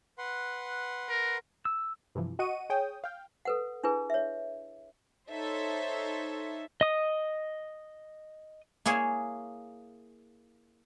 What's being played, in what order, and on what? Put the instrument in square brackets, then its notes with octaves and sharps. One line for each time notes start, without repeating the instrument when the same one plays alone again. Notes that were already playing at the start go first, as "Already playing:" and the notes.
[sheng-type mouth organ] B4 F#5 C6
[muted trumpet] A#4
[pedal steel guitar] E6
[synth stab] G2 C3 E3 F3
F#4 D#5 F#5 C#6 D#7
G#4 C#5 G5 D#6
F5 G5
[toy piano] A4 B4 F#5
D4 E4 G#4 B4
C#5 E5
[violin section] D#4 A4 C5 C#5 E5
[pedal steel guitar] D#5 D#6
[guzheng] A#3 E4 G#4 C#5